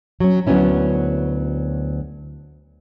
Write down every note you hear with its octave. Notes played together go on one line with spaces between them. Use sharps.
F#3 C#4
D2 F#3 B3 C#4 E4